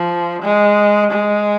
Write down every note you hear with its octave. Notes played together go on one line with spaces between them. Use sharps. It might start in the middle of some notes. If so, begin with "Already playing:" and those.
Already playing: F3
G#3
G#3